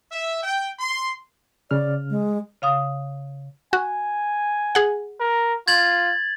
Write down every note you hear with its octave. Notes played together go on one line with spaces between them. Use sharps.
E5
G5
C6
C#3 D5 F6
G#3
C#3 F5 D#6
F#4 G#5
G#4 F#5
A#4
F4 G#6 A6 F#7